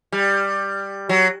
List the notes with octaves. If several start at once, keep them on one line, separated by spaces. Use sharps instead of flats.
G3
F#3